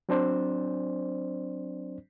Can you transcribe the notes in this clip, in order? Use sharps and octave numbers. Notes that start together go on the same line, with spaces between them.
F#3 C4 D4 C5 D5